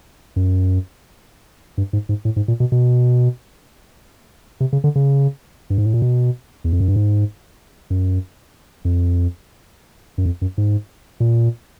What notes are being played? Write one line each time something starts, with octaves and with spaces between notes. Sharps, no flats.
F#2
G2
G#2
G#2
A2
G#2
A#2
B2
B2
C3
C#3
D3
C#3
G2
G#2
A2
A#2
B2
E2
F2
F#2
G2
G#2
F#2
F2
F#2
F2
F#2
G#2
A#2